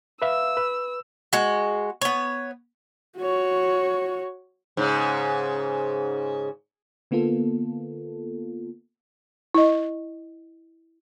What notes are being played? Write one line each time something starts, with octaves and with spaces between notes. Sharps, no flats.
B4 E5 F5 E6
B4
G#3 F#4
B3 C#5
F#4 C#5
G#2 C#3
D3 A#3 B3 F4 A4
E4 D#5